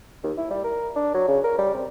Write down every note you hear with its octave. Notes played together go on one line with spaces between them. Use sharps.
D#2
E4
G3
A#4
D4
F#3
C#3
A#4
G3
C3